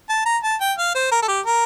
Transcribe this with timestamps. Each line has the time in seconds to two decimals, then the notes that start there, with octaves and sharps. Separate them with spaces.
0.09 A5
0.26 A#5
0.44 A5
0.61 G5
0.78 F5
0.95 C5
1.12 A#4
1.22 A4
1.28 G4
1.46 A#4